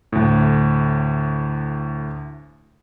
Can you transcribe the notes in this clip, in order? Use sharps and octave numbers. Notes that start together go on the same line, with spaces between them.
D2 A2